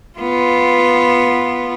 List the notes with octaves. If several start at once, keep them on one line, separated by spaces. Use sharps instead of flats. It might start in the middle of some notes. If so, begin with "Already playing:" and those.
B3 F4